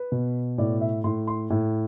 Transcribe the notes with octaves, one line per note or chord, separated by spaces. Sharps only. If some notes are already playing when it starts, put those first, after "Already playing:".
Already playing: B4
B2
A2 D5
E5
A2 C6
C6
A2